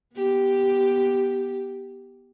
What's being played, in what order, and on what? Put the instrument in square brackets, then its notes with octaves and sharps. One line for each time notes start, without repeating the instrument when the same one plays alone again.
[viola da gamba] B3 G4